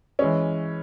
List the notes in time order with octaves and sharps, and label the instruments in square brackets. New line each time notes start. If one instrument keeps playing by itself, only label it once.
[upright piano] E3 G#3 C#4